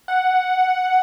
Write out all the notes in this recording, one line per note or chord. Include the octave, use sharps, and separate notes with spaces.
F#5